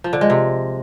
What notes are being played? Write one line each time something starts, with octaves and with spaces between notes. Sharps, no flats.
F3
D3
G#3
C3